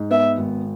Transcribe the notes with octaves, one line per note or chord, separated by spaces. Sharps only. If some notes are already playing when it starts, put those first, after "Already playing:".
Already playing: G#2
B3 E5
G#1